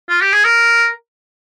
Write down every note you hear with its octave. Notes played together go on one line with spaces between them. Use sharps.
F4
G4
G#4
A#4